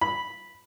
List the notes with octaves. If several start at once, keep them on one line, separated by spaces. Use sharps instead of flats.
B5